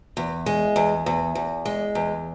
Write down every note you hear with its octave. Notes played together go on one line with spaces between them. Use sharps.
E2
G#3
E2
E2
E2
G#3
E2